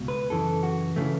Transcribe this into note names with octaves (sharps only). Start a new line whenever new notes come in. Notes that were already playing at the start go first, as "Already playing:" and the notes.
Already playing: C#2 B2
B4
F#2 C#3 E3 A4
F#4
C#3 E3 A3